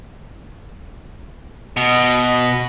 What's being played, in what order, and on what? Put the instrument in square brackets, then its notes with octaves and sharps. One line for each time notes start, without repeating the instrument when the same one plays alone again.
[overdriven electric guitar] B2 [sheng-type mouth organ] D#5